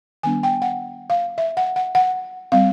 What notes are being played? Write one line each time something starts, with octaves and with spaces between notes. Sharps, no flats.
D#3 G3 B3 D4 G#5
G5
F#5
F5
E5
F#5
F#5
F#5
G3 C4 F5